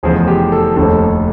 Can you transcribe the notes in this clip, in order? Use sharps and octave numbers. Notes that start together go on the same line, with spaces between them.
F1 E2 C#3 F3 G#4
G4
A4
F1 D#2 D3 A4